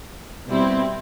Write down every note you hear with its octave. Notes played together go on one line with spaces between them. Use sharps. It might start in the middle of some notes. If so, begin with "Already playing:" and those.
B2 G3 C4 E4